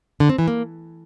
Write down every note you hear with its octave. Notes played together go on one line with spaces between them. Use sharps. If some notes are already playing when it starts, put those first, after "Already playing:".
D3
C4
E3
A#3